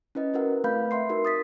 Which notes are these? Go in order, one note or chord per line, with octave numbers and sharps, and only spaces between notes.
C#4 E4 B4 D#5
E4 F#4 A#4 B4 F#5
A3 C4 B4 F5 B5 G6
E5 F#5 C6 C7
D#4 F#4 A#4
D#6 A6 B6